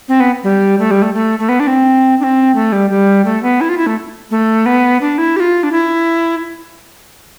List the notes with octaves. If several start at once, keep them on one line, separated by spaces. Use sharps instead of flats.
C4
B3
G3
A3
G3
A3
A3
A3
B3
D4
C4
D4
C4
A3
G3
G3
A3
B3
E4
F4
E4
A3
A3
B3
D4
E4
G4
F4
D4
E4